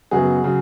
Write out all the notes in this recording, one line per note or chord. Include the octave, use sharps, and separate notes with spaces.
F#2 C#3 F#3 B3 F#4 G#4
C#3 F#3